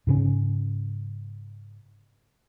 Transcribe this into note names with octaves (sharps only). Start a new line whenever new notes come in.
G#2 C#3 C#4